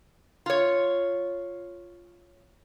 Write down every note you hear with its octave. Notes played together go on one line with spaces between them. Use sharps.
F4 C#5